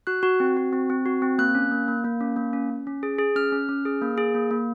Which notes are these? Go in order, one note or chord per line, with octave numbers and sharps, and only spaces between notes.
F#4 F#6
F#4
C4
F#4
C4
C4
F#4
C4
A#3 F#6
C#4
A#3
A#3
A#3
C#4
A#3
C#4
C#4
C#4
G#4
G#4
C#4 F6
C#4
C#4
G#4
A#3
G#4
A#3
A#3